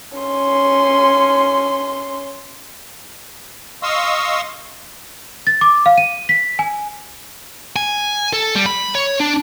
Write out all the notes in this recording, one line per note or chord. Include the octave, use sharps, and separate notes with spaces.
C#4 C6
D#5 F5 C6 C#6 D#6 E6
A6
D6
F5
D#7
B6
G#5
G#5
A4
G3
B5
C#5
D4